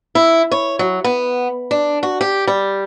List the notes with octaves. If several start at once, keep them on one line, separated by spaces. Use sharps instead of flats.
E4
C#5
F#3
B3
D4
F#4
G4
G3